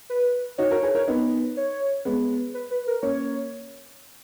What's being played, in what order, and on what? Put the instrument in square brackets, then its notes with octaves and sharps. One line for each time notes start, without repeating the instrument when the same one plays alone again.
[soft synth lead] B4
[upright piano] D#4 F#4 [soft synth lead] C#5
[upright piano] F#4 A#4
G#4 B4
A#4 C#5
B3 D#4
[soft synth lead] C#5
[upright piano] G#3 B3
[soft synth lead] B4
B4
A#4
[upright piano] A#3 C#4 [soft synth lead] C#5